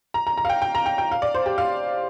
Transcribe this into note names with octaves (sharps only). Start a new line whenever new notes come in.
A#5
A#5
A#5
F5
G5
G5
A#5
G5
G5
F5
D5
C5
G4
F5